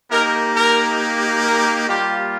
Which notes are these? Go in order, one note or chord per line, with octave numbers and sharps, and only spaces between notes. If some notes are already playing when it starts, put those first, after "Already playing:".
A#3 D#4 G4 A#4
A#4
A#4
G3 A#3 F4 G4